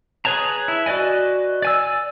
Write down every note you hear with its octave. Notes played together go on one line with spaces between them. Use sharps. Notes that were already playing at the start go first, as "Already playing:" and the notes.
G#4 B4 C#5 A5 A#5
E4
F#4 B4 D5 D#5 G#5
D5 G#5 E6